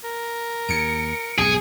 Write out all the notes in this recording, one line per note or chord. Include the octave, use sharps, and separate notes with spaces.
A#4
D#2 C#7 D7
B1 F2 G#2 G#4